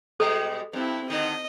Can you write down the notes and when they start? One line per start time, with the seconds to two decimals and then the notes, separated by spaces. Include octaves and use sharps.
0.20 B2 G3 G#3 A4
0.73 G2 C4 E4
1.10 D3 D#3 D#5